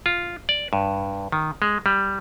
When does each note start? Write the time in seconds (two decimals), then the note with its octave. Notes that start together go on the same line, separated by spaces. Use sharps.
0.06 F4
0.49 D5
0.73 G2
1.32 D#3
1.62 G#3
1.86 G3